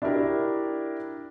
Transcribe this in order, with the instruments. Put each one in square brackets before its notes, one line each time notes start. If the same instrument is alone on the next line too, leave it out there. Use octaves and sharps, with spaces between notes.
[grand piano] D4 E4 F#4 G4 A#4